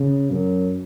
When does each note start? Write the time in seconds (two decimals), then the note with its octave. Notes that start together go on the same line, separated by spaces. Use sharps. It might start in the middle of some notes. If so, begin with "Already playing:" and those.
Already playing: C#3
0.31 F#2